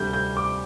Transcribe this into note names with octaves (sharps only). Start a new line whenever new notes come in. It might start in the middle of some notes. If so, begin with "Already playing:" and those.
Already playing: D2 C3 G3 D4 G6
G6
D6